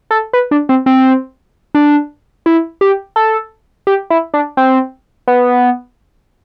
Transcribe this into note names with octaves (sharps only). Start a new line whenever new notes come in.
A4
B4
D4
C4
C4
D4
E4
G4
A4
G4
E4
D4
C4
B3